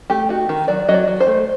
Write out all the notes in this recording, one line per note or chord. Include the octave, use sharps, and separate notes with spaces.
A3 G4
D#4 F#4
D#3
F#3 D5
F#3 D#5
D5
F#3
C5
A3